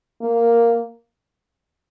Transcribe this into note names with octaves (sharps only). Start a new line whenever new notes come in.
A#3